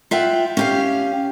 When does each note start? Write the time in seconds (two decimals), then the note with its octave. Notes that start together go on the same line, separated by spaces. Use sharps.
0.11 F4 E5 F#5 G5
0.57 C#4 G4 F5